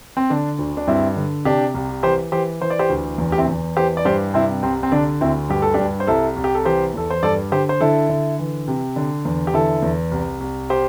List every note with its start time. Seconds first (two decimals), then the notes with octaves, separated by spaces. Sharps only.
0.17 C4
0.30 D3 D4
0.59 D2
0.77 D4
0.87 G2 C4 E4
1.16 D3
1.45 C3 D4 G4
1.74 C2
2.03 E3 G4 C5
2.32 E3 G4 C5
2.61 E3 C5
2.70 D5
2.79 G4 C5
2.90 D2
3.18 E2
3.32 G4
3.38 C4 E4
3.48 E2
3.77 E3 G4 C5
3.97 D5
4.05 G2 G4 C5
4.34 C3 C4 E4
4.63 C2 C4
4.83 C4
4.92 D3 D4
5.21 D2 C4 E4
5.49 G2 G4
5.62 A4
5.74 G2 D4 G4
6.00 C5
6.07 C2 E4 A4
6.36 C2
6.44 G4
6.55 A4
6.65 E3 G4 C5
6.94 E2 A4
7.10 C5
7.23 G2 A4 D5
7.52 D3 G4 C5
7.69 C5
7.81 D3 E4 A4
8.09 D3
8.39 E3
8.68 C3
8.96 D3
9.25 E2
9.47 G4
9.54 D3 E4 A4
9.83 E2
10.11 C2
10.40 C2
10.70 G4 C5